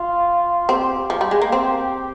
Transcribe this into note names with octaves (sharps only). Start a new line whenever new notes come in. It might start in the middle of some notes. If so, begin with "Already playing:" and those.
Already playing: F4
C4 G4
F3
G3
G#3
A#3
C4